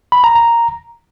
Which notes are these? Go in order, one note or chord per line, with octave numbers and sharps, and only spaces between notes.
B5
A#5
A#5